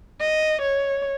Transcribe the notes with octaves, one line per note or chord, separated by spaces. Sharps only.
D#5
C#5